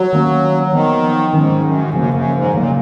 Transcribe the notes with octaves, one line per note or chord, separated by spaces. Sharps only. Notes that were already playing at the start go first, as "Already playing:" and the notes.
Already playing: F#3
D#3 A#3 C#4
D#3 F3 B3
G#2 D#3 F#3 C#4
F#2
F#2 C#3 F3 A#3
F#2
G#2
A#2 C#3 F#3 A#3